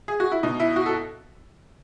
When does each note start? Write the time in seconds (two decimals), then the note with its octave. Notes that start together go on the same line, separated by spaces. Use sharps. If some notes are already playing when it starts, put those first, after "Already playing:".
0.08 G#4
0.20 F#4
0.32 E4
0.43 B2 D#4
0.60 E4
0.76 F#4
0.86 A4